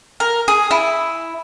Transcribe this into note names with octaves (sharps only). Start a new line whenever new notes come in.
A#4
G#4
E4